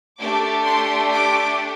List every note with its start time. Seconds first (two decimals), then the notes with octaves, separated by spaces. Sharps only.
0.19 A3 D4 G4 D6
0.65 C6
1.12 D6